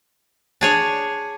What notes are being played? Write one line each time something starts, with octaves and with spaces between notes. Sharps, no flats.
D4 G#4 C#5